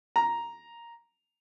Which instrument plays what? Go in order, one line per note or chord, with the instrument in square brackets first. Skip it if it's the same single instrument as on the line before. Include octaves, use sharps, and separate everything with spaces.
[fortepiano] A#5